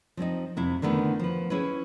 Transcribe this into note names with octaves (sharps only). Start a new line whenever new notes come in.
F3 C4 C#4 D#4
F2 C3 E4
D3 D#3 A3 B3 E4
F3 B4
C#4 E4 G#4 B4